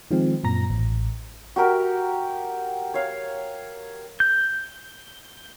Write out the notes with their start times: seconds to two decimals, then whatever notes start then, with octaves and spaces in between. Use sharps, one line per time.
0.11 D#3 F3 G#3 C4
0.44 F#2 A#2 A#5 A#6
0.70 A1
1.56 F#4 G4 A#4 E5
2.94 C#5 F5
4.20 G6